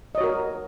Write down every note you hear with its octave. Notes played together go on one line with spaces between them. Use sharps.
F#4 A#4 C#5 D#5